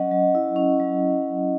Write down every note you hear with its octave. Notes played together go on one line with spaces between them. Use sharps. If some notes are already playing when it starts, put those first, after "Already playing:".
Already playing: F#3 C#4 D#5 F#5
F#3
E4
C#4
F#3